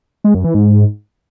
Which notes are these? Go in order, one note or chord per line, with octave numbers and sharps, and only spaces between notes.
G#3
F#2
E3
G#2